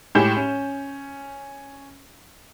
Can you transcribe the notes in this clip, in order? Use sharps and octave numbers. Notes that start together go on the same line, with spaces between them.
A2 G#3 G4 G#5 G6 E7
C#4